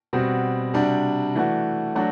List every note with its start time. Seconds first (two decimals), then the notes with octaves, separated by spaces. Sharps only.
0.13 B2 G3 C4 F#4
0.74 C3 G3 D4 F#4
1.35 E3 A3 D4 F#4
1.95 F#3 A3 D4 F#4